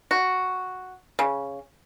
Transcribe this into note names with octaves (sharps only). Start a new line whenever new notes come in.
F#4
C#3